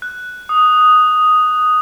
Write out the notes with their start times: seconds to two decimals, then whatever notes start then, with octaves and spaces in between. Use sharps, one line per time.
0.02 F#6
0.49 D#6